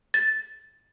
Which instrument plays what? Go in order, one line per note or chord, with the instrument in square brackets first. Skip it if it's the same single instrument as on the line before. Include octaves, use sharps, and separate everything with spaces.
[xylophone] A6